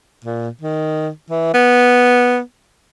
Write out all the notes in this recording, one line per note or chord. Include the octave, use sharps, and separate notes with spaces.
A#2
D#3
E3
B3